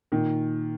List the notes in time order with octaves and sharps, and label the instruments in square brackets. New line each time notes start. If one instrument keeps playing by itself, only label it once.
[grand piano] A#2 [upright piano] D#3